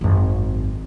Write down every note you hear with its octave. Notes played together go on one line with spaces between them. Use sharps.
G#1 F#2